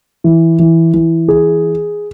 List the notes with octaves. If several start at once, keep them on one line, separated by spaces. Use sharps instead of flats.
E3
E3
E3
G#4